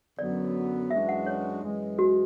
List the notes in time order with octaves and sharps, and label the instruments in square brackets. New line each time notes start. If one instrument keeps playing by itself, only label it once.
[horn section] F#2 D3 F#3 B3 [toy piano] D5
[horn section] F#2 E3 G#3 D4 F#4 [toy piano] E5
[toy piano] F#5
C#5
[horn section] F#2 E3 G#3
[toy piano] F#4